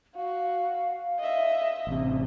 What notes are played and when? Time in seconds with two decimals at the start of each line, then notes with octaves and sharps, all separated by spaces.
0.15 F#4 F5
1.19 D#5 E5
1.87 A1 C3